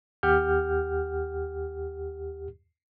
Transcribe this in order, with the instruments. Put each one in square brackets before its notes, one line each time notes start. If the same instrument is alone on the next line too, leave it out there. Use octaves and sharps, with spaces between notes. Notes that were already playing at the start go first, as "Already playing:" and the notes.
[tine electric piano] D#2 G4 F#5 F6 G6